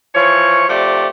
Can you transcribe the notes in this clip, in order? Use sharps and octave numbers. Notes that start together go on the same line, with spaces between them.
E3 F3 C#5
C3 F3 A3 G4 D5